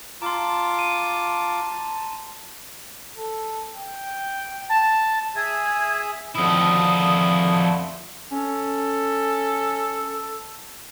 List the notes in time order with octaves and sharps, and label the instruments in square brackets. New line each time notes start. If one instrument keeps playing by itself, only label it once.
[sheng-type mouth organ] F4 D6 [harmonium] A5 [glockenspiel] A#5 C6
[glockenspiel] D#7
[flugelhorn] A4
G5
[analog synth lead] A5
[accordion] G#4 E5 D#6 [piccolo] G#6
[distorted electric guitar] F2 E4 [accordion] D3 F3 A3 [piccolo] D#6
[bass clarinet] C#4 [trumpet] A4